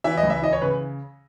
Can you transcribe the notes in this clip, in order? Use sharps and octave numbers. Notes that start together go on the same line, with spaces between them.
E3 E5
D#5
C#2
E5
E3 D#5
C#5
C#3 B4